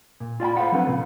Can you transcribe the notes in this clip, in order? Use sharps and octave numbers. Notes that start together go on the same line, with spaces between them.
A#2
F4 D5 G#5 B5
A4 C5 D5 F5 F#5 B5
F3 F#3 C4 D4 A4 B4
A#2 C#3